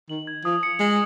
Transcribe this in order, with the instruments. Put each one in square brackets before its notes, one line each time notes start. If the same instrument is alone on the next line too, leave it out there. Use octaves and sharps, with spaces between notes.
[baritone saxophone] D#3 [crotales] F#7
[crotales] G#6
[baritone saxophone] F3 [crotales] D#6
[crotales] C#7
[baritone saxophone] G#3 [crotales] F#7